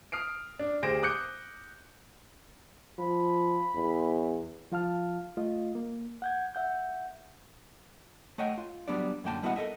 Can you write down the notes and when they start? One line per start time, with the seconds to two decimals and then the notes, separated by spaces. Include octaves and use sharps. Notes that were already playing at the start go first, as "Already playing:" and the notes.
0.12 D#6 F6 C7 D7
0.59 D4
0.83 D2 G4 G#4 C5 A#6 D7
1.03 D6 D#6 F#6 G6 C#7
2.99 F3 B5
3.75 E2
4.72 F3 F4 F5 A5 F6
5.37 A3 F4 D#5
5.75 A#3
6.22 F#5 G6 G#6
6.55 E5 F#5 G6
8.38 A3 C#5 D#5 E5 F#5 G5
8.58 F4
8.88 F#3 G3 B3 D4 D5
9.24 F#2 D3 A#3 G5 A5
9.43 G3 B3 E4 F#4 D#5 F#5
9.56 A4 A#4 D#5 E5